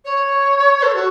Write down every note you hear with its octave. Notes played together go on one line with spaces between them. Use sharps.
C#5
A4
F#4